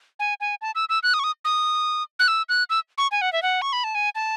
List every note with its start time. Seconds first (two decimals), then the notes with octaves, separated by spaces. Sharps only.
0.19 G#5
0.41 G#5
0.62 A5
0.75 E6
0.89 E6
1.03 F#6
1.14 D#6
1.19 C#6
1.24 D#6
1.45 D#6
2.19 F#6
2.28 E6
2.49 F#6
2.70 E6
2.98 C#6
3.11 G#5
3.22 F#5
3.33 E5
3.43 F#5
3.62 C#6
3.73 B5
3.84 A5
3.95 G#5
4.15 A5